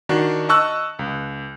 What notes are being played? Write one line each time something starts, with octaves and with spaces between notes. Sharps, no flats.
D#3 D4 F#4
D#5 A5 C#6 E6 F#6
C#2